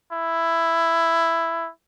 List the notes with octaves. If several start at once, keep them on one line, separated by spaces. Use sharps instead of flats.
E4